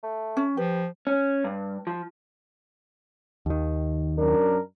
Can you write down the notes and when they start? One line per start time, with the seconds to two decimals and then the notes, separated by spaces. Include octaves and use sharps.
0.03 A3
0.37 C#4
0.57 F3 G4 B4
1.07 C#4
1.44 G2
1.87 F3
3.46 D#2 D#3
4.18 F#2 D4 A#4